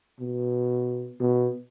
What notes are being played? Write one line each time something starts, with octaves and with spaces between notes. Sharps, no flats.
B2
B2